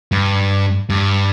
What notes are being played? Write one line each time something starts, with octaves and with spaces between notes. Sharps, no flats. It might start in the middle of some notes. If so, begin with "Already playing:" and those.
G2
G2